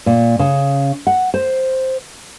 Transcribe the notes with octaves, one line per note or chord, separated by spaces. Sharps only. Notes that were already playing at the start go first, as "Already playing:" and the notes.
A#2
C#3
F#5
C5